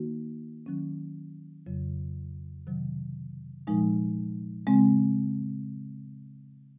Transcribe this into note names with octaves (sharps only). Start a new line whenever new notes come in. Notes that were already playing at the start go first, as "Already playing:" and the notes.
Already playing: D#3 A#3 D#4 F#4
D#3 F#3 C#4
F2 C#3 F#3
C3 D#3 F#3
A#2 F3 G#3 D#4
C#3 G#3 C4